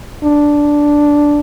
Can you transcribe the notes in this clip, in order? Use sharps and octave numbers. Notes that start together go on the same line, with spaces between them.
D4